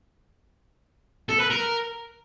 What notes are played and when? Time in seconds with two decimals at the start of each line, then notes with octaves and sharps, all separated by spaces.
1.29 A4
1.40 B4
1.50 A#4